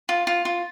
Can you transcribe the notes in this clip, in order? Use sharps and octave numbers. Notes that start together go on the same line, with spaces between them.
F4
F4
F4